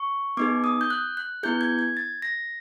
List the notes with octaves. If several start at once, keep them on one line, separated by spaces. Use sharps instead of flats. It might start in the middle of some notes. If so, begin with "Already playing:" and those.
Already playing: C#6
B3 D#4 G#4 D6
D#6
G6
F#6
F#6
B3 E4 G#4 G6
G#6
G#6
A6
A#6